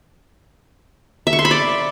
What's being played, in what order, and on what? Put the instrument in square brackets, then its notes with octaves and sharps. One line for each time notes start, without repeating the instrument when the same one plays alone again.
[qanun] E5
C#6
C6
B5
D5